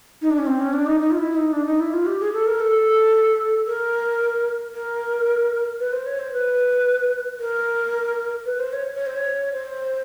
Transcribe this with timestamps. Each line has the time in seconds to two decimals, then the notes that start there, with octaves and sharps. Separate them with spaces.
0.22 D#4
0.30 D4
0.38 C#4
0.46 C4
0.60 C#4
0.73 D4
0.86 D#4
1.00 D#4
1.11 F4
1.18 E4
1.35 D#4
1.52 D4
1.66 D#4
1.80 E4
1.93 F4
2.06 G4
2.20 G#4
2.33 A4
2.47 A#4
2.60 A4
3.67 A#4
4.73 A#4
5.80 B4
5.92 C5
6.06 C#5
6.19 C5
6.32 B4
7.39 A#4
8.46 B4
8.59 C5
8.73 C#5
8.96 C#5
9.06 C5
9.16 C#5
9.53 C5